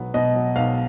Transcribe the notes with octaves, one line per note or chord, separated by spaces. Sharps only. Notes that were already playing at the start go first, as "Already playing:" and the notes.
Already playing: B1 B2 F#3 B3
B2 D#5
F#3
B1 F5